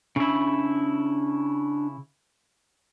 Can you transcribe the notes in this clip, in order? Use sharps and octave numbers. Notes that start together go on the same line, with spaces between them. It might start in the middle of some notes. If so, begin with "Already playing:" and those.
C#3 D4 E4